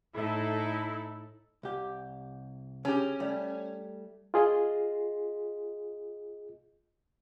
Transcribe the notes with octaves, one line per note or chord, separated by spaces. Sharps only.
A2 D#4 E4 A4
C2 G4
C#3 C#4 G4
G3 A3
F4 G#4 D#5